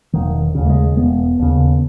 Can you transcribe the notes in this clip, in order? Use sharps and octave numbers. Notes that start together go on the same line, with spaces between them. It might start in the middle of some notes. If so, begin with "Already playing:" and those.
E1 D#3
D#2 C#3
A3
G#3
E1 B3
D#2 C#3